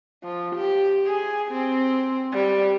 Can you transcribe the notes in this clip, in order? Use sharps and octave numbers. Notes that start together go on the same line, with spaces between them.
F3
G4
G#4
C4
G3